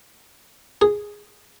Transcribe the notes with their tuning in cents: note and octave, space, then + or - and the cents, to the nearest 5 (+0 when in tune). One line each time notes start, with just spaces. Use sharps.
G#4 -5